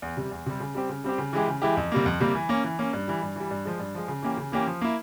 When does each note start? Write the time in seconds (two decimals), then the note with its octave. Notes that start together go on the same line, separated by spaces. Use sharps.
0.02 E2
0.17 C3 G3
0.31 E2
0.46 C3 G3
0.60 C#3
0.75 G3 C4 G4
0.89 C#3
1.04 G3 C4 G4
1.18 C#3
1.33 E3 G#3 E4 G4
1.47 C#3
1.62 E3 G#3 E4 G4
1.77 F2
1.92 C3 G3 A#3
2.06 F2
2.20 C3 G3 A#3
2.35 E3
2.49 A#3 C#4
2.64 E3
2.79 A#3 C#4
2.93 G2
3.08 E3 G3
3.22 G2
3.36 E3 G3
3.51 G2
3.65 F3 G#3
3.80 G2
3.95 F3 G#3
4.08 C#3
4.23 E3 A#3 C#4 G4
4.37 C#3
4.52 E3 A#3 C#4 G4
4.67 F3
4.81 A#3 E4